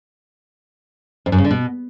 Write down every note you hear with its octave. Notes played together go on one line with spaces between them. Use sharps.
F2
F#2
C#3
D3
B2